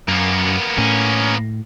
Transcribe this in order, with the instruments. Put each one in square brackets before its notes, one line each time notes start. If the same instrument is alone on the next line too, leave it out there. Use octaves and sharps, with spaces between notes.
[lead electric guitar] F#2 [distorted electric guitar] A#3 B3
[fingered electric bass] A2 [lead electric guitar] C#4